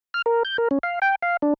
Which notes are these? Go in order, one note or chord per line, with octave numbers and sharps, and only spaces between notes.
F6
A#4
G6
A#4
C#4
F5
G5
F5
D4